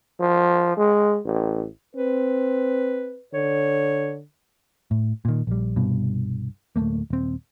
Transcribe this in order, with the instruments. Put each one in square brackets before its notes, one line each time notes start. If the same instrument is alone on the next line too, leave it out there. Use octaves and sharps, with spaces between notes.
[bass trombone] F3
G#3
A1
[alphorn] C4 [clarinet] B4
[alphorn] D3 [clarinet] C#5
[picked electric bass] A2
A#2 D#3
A#1 G3
C2 G2 B2
D1 G1 A3 A#3
D#1 C4